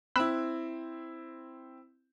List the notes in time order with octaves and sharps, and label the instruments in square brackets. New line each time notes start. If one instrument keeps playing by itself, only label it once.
[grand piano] C4 E4 [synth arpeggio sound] B5 E6 F#6